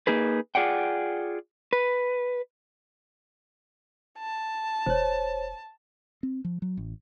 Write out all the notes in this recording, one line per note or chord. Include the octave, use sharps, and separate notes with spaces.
A#3 D#4 G#4 B4
F4 G#4 D5 F#5 G5
B4
A5
E1 C5 C#5
C4
F3
F#3
A1